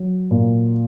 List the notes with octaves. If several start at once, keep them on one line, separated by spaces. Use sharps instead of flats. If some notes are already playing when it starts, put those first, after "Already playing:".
Already playing: F#3
A#2